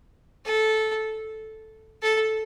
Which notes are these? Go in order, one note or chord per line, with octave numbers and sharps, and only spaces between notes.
A4
A4